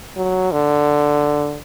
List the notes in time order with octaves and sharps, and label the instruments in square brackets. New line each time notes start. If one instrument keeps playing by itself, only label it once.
[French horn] F#3
D3